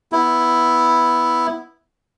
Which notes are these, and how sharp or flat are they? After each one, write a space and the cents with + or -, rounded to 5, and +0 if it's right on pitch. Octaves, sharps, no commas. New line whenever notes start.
B3 +0 E4 +0